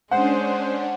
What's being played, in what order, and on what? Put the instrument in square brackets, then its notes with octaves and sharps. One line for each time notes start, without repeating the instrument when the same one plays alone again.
[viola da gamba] G#3 [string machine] C#4 D4 [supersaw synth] C5 [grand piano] F#5